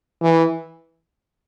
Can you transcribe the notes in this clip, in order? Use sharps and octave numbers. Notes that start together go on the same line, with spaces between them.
E3